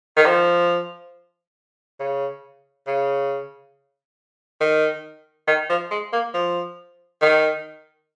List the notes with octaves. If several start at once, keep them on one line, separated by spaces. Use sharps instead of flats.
D#3
F3
C#3
C#3
D#3
D#3
F3
G#3
A#3
F3
D#3